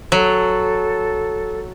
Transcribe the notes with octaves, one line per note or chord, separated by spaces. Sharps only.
F#3 A4